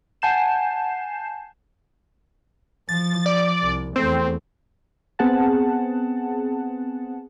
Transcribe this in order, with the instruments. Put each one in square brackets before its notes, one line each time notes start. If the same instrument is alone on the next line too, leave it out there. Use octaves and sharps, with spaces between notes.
[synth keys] F#5 G#5 A5 G6 C7 E7
[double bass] F3 [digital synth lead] A6
[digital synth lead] D5
[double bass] C2
[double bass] E2 A3 [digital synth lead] C4
[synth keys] B3 C4 G#4 F#5 A5